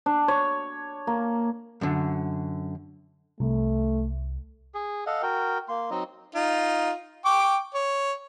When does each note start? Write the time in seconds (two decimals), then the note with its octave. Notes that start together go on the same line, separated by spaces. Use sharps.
0.06 D4
0.28 C#5
1.07 A#3
1.81 F#2 D3
3.40 C2 A3
4.74 G#4
5.07 A4 D#5 F5 F#5
5.22 F#4 A#4 G5
5.69 A#3 C6
5.91 F#3 C4 D#4 D#5
6.35 D#4 F4
7.25 G5 C#6 D6
7.75 C#5